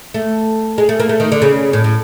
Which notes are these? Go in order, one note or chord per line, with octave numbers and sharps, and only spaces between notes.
A3
G#3
A3
A#3
A3
D#3
D3
C#3
A2
A2